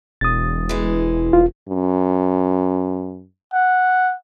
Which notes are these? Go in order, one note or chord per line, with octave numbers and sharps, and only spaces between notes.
E1 D#6 A6
E3 G#3
E1 F4
F#2
F#5